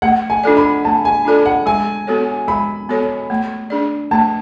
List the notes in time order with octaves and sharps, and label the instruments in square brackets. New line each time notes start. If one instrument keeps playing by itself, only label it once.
[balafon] A3 [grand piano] F#5
[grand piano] G#5
[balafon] D4 F4 A4 D5
[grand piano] B5
[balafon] A3 [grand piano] A5
[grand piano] G#5
[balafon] D4 F4 A4 D5
[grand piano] F#5
[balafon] G#3 [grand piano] G#5
[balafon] B3 F#4 A4 C#5
[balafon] G#3 [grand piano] B5
[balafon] B3 F#4 A4 C#5
A3
D4 G#4 D5
[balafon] A3 [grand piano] A5